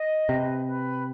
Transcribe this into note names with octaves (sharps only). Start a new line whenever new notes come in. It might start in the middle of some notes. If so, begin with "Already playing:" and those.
Already playing: D#5
C3 B4
B4